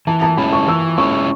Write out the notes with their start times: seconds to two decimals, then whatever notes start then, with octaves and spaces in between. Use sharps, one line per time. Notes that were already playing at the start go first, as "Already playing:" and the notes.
0.07 E3 A5
0.22 A5
0.37 G#3 C#4 E4 B5
0.53 C#6
0.67 E3 E6
0.98 G#3 C#4 E4 C#6